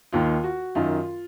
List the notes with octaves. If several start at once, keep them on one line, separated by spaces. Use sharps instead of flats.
D#2 D#3 F4
F#4
F#2 D#3 F4